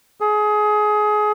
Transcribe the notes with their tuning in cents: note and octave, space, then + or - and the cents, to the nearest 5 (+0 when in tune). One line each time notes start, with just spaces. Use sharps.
G#4 +25